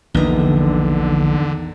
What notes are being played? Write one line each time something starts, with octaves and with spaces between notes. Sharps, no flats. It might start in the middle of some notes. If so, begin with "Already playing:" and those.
A#1 E2 D3 D#3 D#4